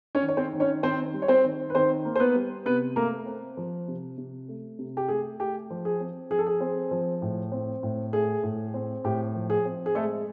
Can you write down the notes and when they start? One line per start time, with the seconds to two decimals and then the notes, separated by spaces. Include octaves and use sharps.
0.15 C#4 C#5
0.22 D#3
0.28 C#5
0.37 C4 C5
0.53 D#3
0.60 C#4 C#5
0.83 D#3 C4 C5
1.14 G3
1.22 C#5
1.28 C4 C5
1.44 D#3
1.70 B4
1.75 D#3 C4 C5
2.05 A#3
2.16 C5
2.20 B3 B4
2.35 G3
2.66 C3 B3 B4
2.96 A3 A#3 A#4
3.26 C4
3.57 F3
3.88 C3
4.18 C3
4.48 A3
4.79 C3
4.97 G4
5.09 A3 G#4
5.40 A3 G4
5.70 F3
5.85 G#4
6.00 C4
6.30 F3 G#4
6.39 A4
6.46 G#4
6.61 C4
6.91 F3
7.22 A2
7.52 C4
7.83 A2
8.13 A3 G#4
8.43 A2
8.74 C4
9.04 A2 G4
9.35 F3
9.50 G#4
9.65 C4
9.86 G#4
9.95 G#3 A3 A4